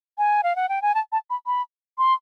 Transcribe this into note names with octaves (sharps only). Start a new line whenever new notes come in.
G#5
F5
F#5
G5
G#5
A5
A5
B5
B5
C6